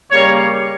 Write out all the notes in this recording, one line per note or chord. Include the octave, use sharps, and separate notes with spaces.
C#3 G3 A#3 C#5